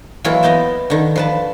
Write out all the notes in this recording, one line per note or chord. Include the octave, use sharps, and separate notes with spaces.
E3 F#3 G#3 A#3 E4 F4
B3 D#5 G5 A5
D3 D#3
F3 B4 A5